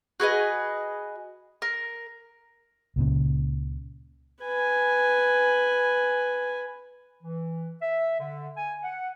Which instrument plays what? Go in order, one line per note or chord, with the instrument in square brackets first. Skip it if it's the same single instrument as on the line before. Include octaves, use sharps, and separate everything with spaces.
[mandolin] F#4 G#4 B4 D#5
A#4
[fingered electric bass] C#2 A#2 C#3
[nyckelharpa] B4 G#5
[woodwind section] E3
E5
D3
G#5
F#5